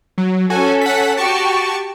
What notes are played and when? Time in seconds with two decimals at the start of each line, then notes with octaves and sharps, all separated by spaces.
0.18 F#3
0.50 C#4 F#4 A4 G#5
0.81 F#5 B6
1.17 F#4 G4 A5 C#6